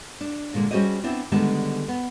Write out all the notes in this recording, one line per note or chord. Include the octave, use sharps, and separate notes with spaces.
D4
A#2 D3 G#3 A#3
G3 C#4 F#4 G#4 C5 D#5
B3 C4 D4 E4
D3 D#3 G3 G#3 B3 A5
B3